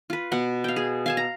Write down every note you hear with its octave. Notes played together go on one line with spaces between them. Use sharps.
F4 B4
B2 B3 F#5
F5 G5
G#4
F5 G#5 A5
A#5